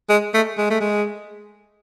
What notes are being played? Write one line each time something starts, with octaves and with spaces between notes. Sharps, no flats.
G#3
A3
G#3
A3
G#3